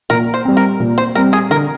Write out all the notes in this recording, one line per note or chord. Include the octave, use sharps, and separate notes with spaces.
A#2 A#4
C5
G3 C4
A#4
A#2
C5
G3 C4 A#4
G#4
D3 A#4